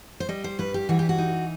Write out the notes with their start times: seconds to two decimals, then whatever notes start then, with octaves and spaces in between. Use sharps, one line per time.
0.20 C5
0.29 G3 D#5
0.44 C5
0.59 G2 B4
0.74 G4
0.89 E3 F#4
0.99 G4
1.09 F#4
1.18 D#4